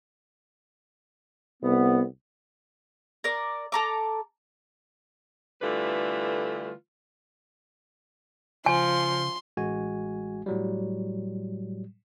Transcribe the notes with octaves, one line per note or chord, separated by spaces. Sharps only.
C2 B3
A#4 D5
A4 A#5 D6
D3 E3 G3 A3 F4 B4
C#3 F3 G#5 C6
A1 G#3 F#4 G#5
A2 F#3 G3